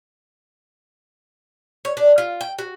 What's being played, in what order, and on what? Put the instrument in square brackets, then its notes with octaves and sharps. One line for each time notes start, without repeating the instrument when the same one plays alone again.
[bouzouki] C#5
D4
F4
G5
F#4